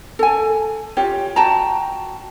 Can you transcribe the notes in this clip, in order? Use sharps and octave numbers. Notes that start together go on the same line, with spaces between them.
A4 G#5
F4 G4 C#5
F#4 G5 A5 A#5